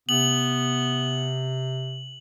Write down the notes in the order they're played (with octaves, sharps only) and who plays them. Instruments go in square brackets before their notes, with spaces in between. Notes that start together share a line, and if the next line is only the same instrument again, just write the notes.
[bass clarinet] C3 [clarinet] B3 [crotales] F#7